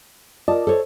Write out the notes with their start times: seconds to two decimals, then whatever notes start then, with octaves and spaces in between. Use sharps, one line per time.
0.48 F4 A#4 D5 D#5 A5
0.67 A4 C5 C#5